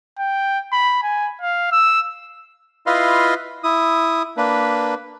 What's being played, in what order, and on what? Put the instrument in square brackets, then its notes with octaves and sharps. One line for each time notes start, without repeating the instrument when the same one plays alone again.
[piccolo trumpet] G5
B5
G#5
F5
E6
[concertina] E4 F4 B4 D#5 F5 C6
E4 D#6
A#3 D4 B4